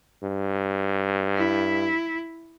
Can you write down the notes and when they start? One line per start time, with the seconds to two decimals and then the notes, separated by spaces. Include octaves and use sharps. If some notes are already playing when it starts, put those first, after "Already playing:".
0.23 G2
1.36 E4